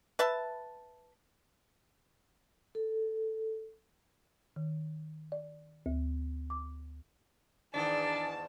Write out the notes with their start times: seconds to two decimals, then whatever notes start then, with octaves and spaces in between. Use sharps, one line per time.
0.19 B4 E5 A5
2.75 A4
4.56 D#3
5.32 D5
5.86 D2
6.50 D6
7.74 E2 G#2 D#3 D4 A5